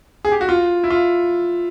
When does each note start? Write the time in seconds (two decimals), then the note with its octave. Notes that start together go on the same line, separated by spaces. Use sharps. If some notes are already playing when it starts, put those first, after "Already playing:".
0.25 G#4
0.32 G4
0.41 F#4
0.49 F4
0.84 E4
0.91 F4